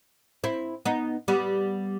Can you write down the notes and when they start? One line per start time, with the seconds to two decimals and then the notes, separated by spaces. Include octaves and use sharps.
0.44 C4 E4
0.85 B3 D#4
1.28 G3 B3